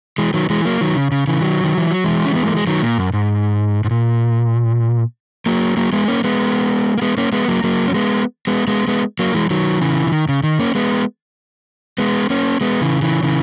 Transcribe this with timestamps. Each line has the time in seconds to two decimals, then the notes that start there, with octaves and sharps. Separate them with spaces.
0.18 E3 G#3
0.34 D#3 F#3
0.50 E3 G#3
0.65 F#3 A#3
0.81 D#3 F#3
0.96 C#3
1.12 C#3
1.27 C#3 E3
1.42 D#3 F#3
1.64 D#3
1.78 E3
1.91 F#3
2.04 E3 G#3
2.25 C#4
2.35 B3
2.46 A#3
2.57 G#3
2.67 D#3 F#3
2.83 A#2
2.98 F#2
3.13 G#2
3.84 G#2
3.91 A#2
5.46 F#3 A#3
5.77 F#3 A#3
5.93 G#3 B3
6.08 A#3 C#4
6.24 G#3 B3
6.98 A#3
7.02 G#3 B3
7.18 A#3 C#4
7.32 G#3 B3
7.48 F#3 A#3
7.64 F#3 A#3
7.88 C#4
7.94 G#3 B3
8.47 G#3 B3
8.67 G#3 B3
8.88 G#3 B3
9.19 F#3 A#3
9.34 E3 G#3
9.50 D#3 F#3
9.81 C#3 E3
10.07 C#3
10.12 D#3
10.29 C#3
10.43 D#3
10.59 A#3 C#4
10.75 G#3 B3
11.98 G#3 B3
12.30 A#3 C#4
12.61 G#3 B3
12.81 C#3 E3
13.02 C#3 E3
13.23 C#3 E3